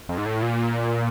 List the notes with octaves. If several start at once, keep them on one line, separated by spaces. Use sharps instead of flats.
F2
G#2
A2
A#2